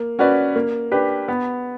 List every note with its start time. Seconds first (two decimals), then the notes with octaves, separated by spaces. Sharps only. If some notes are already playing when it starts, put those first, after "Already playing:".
Already playing: A#3
0.19 C#4 F#4 B4 D5
0.55 A#3
0.92 D4 G4 B4
1.28 B3